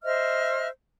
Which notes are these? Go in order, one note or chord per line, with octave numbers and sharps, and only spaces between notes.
C5 D#5 E5 F6